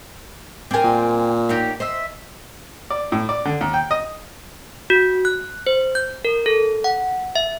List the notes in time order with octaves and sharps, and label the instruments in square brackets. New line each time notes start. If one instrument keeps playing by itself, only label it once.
[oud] C4 A#4 [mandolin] D5 G#5
[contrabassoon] A#2
[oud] A#3 D#4 [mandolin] F#4 G4 C#5
[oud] C5 [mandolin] D#5 E5
[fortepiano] D5
A2
D5
D3
D#2
G5
D#5
[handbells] F#4
F#6
C5
G6
A#4
A4
F#5
E5